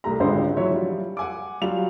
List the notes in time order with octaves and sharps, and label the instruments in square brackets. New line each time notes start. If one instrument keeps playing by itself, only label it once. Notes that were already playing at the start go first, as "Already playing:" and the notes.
[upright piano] C2 A3 G4 A#5
G#1 C#2 G#2 D3 C5
E3 F#3 C#5 E5
F3 G3
F#5 G#5 D6
F#3 G3 F4 F7